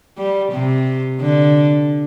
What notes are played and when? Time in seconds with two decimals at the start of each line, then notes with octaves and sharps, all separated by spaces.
0.18 G3
0.52 C3
1.20 D3